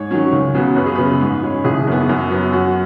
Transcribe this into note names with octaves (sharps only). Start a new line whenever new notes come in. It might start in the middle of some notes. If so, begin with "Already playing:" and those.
Already playing: G#2 C#5
D#3 F#3 C#4
C#2
C#3 F#3 B3
F#2 B4
G#4
C#3 B3 B4
G#2
G#3 C#4
F#1 G#4
F#2 D#3 B3
F#2
F#3 B3
F#2 F#4